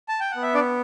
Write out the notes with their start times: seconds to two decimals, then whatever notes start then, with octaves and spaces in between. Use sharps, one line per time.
0.08 A5
0.20 G5
0.32 B3 F#5
0.42 E5
0.54 D4 D5